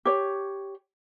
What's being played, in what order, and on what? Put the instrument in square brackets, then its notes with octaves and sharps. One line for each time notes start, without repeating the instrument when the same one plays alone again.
[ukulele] G4 C#5